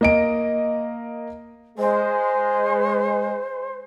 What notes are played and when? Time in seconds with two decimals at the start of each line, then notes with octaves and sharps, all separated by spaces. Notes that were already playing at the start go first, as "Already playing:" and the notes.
0.01 A#3 D#5 D7
1.78 G#3 C5